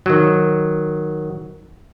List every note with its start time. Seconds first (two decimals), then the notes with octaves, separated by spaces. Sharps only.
0.06 D#3 F#3